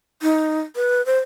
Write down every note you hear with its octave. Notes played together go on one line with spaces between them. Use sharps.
D#4
B4
C5